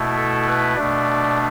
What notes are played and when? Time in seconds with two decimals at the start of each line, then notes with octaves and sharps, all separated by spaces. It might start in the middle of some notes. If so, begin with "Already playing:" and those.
Already playing: B2 A3 E4
0.17 A4
0.46 B4
0.75 B2 A3 D4 D5